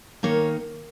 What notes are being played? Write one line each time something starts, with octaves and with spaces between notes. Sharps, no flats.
D#3 A#3 C#5